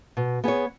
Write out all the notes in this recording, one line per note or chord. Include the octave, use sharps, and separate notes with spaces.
B2
B3 G#4 C#5